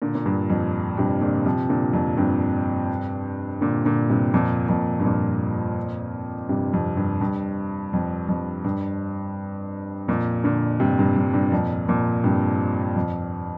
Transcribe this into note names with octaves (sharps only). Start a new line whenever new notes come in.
A#2 D3
A#2
G2
F2
G2 C3
A#2 D3
C3 F3
A#2 D3
F2 A#2
G2 C3
A#2 D3
A#2 D3
G2 C3
F2 A#2
F2 A#2
G2
F2 A#2
G2 C3
F2
G2
G2
F2
F2
G2
F2 A#2
A#2 D3
G2 C3
G2
G2
G2
F2 A#2
F2 A#2
G2 C3
F2